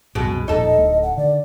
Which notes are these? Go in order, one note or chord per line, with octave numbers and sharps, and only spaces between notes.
C2 F#2 B2 G#3
E1 F2 A#2 D#4 A4 D#5
D1 A3
F#5
D3 D5